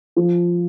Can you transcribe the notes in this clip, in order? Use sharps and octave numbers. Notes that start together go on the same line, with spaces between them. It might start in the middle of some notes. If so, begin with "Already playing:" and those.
F3